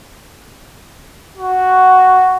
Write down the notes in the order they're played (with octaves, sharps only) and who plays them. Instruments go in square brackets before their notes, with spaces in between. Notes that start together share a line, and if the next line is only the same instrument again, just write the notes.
[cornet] F#4